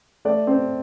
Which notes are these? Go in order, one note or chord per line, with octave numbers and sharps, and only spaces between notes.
A3 D5
C4